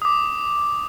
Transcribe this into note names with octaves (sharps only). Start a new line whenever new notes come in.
D6 D#6